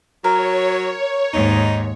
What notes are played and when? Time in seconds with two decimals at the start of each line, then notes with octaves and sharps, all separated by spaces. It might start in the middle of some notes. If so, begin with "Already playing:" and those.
0.24 F#3 A#4 C#5
1.33 D#2 G#2 D#4